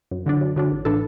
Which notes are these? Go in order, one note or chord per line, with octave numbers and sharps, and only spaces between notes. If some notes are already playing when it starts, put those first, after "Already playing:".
F#2
D3 F#3 D4
F#2
D3 F#3 D4
A1
A2 E3 D4 A4